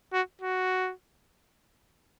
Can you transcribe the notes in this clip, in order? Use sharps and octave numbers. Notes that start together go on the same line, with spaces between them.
F#4
F#4